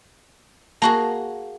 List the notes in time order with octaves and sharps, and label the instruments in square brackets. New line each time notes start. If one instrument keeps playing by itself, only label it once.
[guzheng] A#3 F#4 G#4 [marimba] A5